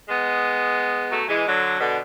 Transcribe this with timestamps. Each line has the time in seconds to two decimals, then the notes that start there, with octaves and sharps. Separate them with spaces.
0.08 G#3 B3
1.11 F#3 A3
1.29 E3 G#3
1.46 D3 F#3
1.80 B2 D3